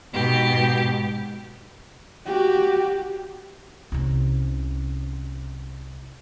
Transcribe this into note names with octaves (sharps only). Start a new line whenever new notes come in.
G#2 B2 G4
F#4 G4
C2 C#4